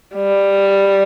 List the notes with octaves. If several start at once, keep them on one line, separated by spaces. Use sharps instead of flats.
G3